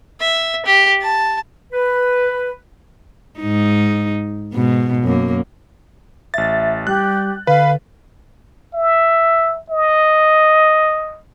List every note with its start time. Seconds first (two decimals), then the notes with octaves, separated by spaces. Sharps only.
0.20 E5
0.66 G4
1.02 A5
1.72 B4
3.40 G#2 D#4
4.53 G#2 B2
5.04 F#2 A#3
6.34 A1 E5 A6
6.87 G3 G4 F#6
7.47 D3 B4 F5
8.74 E5
9.70 D#5